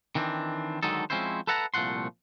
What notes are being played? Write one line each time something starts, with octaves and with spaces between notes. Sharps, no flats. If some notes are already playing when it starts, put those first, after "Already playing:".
D#3 E3 B3 C4 D4
D3 D#3 F#3 G#3 D#4 A4
F3 G#3 C4 C#4 E4 C5
A4 B4 E5 F#5 A5 A#5
C2 A#2 F3 A3 F#5 C6